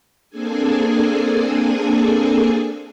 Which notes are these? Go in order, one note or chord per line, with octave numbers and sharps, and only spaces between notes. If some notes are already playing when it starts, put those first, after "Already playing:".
A#3 C4 D4 G#4 A4 G#5